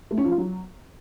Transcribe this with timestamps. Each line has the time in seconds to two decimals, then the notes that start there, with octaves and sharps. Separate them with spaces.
0.11 A3
0.18 C#4
0.24 F3
0.31 F4
0.38 F#3